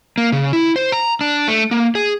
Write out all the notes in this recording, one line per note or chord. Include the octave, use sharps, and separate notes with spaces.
A#3
C#3
E4
C5
A#5
D4
A3
A#3
G#4